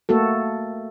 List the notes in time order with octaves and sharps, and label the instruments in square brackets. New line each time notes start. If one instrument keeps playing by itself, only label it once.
[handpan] A3 A#3 F#4 A4